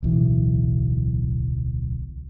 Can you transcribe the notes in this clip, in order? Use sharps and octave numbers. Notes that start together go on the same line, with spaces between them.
D1 B1 E3